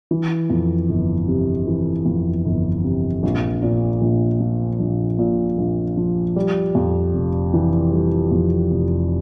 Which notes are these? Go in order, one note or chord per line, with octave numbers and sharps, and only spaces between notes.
E3
F2
G1
C3
E3
F2
G1
C3
A#1
A#2
A#1
F3
A#1
A#2
A#1
F3
G3
F2
F1
E3
G3
F2
F1